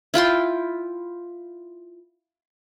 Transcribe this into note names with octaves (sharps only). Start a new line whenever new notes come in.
E4 F4 G5 C6